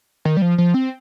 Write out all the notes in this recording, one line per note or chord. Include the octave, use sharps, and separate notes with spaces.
D#3
G3
F3
F3
C4